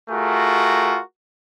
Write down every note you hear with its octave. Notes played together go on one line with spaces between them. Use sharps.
A3 F4 F#4 G#4 A#4